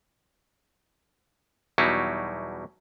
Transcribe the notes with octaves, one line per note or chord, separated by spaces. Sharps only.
E2 B2 F#3 G3 D#4 E4